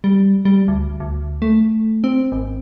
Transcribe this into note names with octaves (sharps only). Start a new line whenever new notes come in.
G3
G3
D2
D2
A3
C4
G#1